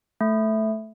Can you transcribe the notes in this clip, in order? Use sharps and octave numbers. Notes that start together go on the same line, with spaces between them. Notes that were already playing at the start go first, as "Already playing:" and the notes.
A3